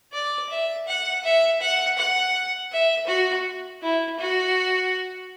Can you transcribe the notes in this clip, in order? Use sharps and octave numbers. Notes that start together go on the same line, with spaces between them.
D5
E5
F#5
E5
F#5
F#5
E5
F#4
E4
F#4